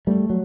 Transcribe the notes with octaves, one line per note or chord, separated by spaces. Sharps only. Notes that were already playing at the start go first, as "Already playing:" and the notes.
G3 A3
F#3